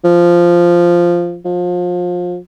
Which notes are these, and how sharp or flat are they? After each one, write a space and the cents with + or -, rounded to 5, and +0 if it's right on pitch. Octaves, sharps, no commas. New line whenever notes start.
F3 -5
F3 +30